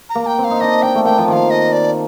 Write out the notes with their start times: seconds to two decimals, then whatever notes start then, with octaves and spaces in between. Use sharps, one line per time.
0.09 A#5
0.15 A#3
0.27 G5
0.38 C4
0.44 F5
0.51 D#4
0.60 D4 D#5
0.83 D4 G5
0.95 A3
1.05 A#3 G5
1.18 F3
1.28 D#3 F5 G5
1.50 D#5
1.73 D5